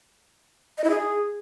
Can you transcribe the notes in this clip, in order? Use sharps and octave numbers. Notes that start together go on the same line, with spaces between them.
D#5
E4
G#4